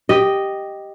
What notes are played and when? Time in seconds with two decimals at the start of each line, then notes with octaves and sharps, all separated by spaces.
0.09 G4 D#5